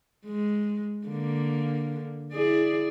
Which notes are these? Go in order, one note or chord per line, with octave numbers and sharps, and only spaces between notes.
G#3
D3 A#3
E4 G#4 D5